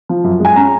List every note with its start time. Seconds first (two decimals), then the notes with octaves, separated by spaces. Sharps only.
0.09 F3
0.24 F#2
0.40 G#3 G#5
0.56 C#4 A#5